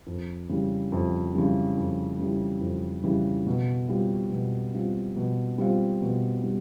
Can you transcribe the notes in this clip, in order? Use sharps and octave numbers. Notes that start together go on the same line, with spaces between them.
F2
C#3 E3 G3
F2
C#3 E3 G3
F2
C#3 E3 G3
F2
C#3 E3 G3
B2
G3 C4 F4
B2
G3 C4 F4
B2
G3 C4 F4
B2
G3